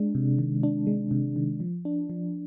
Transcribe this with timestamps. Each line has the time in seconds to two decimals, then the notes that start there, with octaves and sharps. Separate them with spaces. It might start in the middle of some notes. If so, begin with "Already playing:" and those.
Already playing: G#3 D4
0.15 C3
0.39 D#3
0.63 D4
0.87 G#3
1.11 C3
1.36 D#3
1.60 F3
1.85 D4
2.10 F3